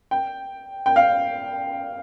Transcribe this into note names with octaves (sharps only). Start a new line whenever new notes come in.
G5
G5
F5